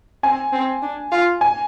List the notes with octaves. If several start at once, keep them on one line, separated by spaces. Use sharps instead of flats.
C4 G#5
C4
D4
F4
G#5